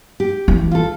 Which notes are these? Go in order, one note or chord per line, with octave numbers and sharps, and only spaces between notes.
G4
E3
F4 A4